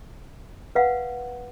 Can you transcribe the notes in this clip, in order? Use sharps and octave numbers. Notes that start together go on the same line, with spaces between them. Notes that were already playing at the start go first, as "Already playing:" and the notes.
B4 F5 F#5